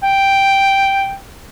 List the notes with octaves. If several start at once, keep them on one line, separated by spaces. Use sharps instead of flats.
G5